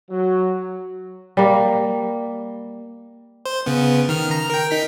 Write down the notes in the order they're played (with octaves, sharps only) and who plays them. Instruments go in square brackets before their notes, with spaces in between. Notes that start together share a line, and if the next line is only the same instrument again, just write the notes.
[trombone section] F#3
[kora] G3 A#3
[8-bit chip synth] C5
C#3 B3
D#3 F6
A#5
A#4 G5
D#4 B6